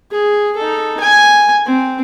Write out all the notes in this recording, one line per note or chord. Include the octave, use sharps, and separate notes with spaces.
G#4
D#4 A4
G#5
C4